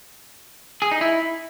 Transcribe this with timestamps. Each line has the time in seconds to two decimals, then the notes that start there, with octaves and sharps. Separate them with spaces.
0.82 G#4
0.91 D#4
1.01 E4